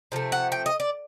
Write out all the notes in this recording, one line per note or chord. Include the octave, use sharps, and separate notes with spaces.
C3 F3 A3
F#5
G5
D#5
D5